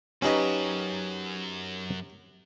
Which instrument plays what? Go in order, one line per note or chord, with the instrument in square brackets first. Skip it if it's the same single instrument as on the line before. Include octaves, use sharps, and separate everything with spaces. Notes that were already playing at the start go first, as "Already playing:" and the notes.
[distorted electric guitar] F#2 [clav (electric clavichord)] C#4 D#4 D#5 [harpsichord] F#4 G4 B4